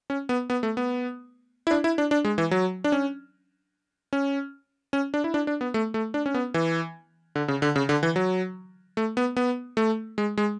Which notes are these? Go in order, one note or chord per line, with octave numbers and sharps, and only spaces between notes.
C#4
B3
B3
A3
B3
E4
D4
E4
D4
D4
G#3
E3
F#3
D4
C#4
C#4
C#4
D4
E4
D4
D4
B3
A3
A3
D4
C#4
B3
E3
D3
C#3
D3
C#3
D3
E3
F#3
A3
B3
B3
A3
G#3
G#3